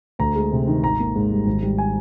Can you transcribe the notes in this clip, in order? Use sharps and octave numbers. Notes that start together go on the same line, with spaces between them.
D2 A#5
G#3
C3
D#3
G#1 A#5
A#3
G#2
G3
G#1
G3
G#5